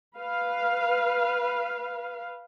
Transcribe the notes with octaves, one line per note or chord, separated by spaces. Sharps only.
B4 F5